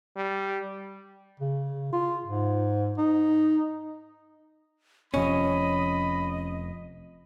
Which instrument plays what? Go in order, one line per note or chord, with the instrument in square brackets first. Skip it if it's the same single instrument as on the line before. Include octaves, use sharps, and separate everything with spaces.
[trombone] G3
[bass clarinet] C#3
F4
G#2
D#4
[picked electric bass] F1 C3 F3 [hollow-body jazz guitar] C#4 [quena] D#5 [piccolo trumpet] B5